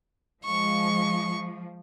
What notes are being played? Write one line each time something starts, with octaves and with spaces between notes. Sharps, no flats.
F3 G#3 C#6